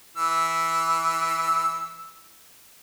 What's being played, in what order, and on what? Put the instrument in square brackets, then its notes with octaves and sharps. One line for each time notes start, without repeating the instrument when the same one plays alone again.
[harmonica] E3 E6